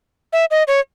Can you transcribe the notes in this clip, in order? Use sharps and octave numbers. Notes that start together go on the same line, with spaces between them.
E5
D#5
C#5